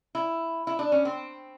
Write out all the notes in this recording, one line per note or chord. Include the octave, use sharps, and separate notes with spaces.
E4
E4
D4
C#4
C4